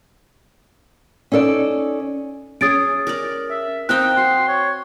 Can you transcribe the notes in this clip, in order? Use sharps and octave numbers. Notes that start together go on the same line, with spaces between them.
C#4 D#4 A4 D5
C#4 G#4 D#6 A6 D7
A#4 D5
E5
C4 D#4 F5 G5 F#6
F#4 C6
C#5